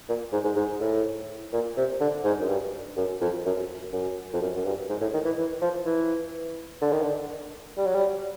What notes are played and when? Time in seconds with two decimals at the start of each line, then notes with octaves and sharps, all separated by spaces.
0.09 A#2
0.32 G#2
0.44 G#2
0.56 G#2
0.80 A2
1.53 A#2
1.77 C3
2.00 D3
2.24 G#2
2.40 F#2
2.49 G2
2.97 F#2
3.21 F2
3.45 F#2
3.92 F#2
4.33 F2
4.41 F#2
4.57 F#2
4.65 G2
4.89 G#2
5.01 A2
5.14 D#3
5.25 E3
5.37 E3
5.61 F3
5.85 E3
6.81 D3
6.92 D#3
7.02 D3
7.77 G3
7.86 F#3
7.95 G3